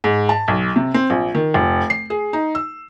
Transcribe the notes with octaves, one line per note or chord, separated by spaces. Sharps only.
G#2
A5
B1
C3
C4
A#1
D#3
F1
C7
G#4
D#4
E6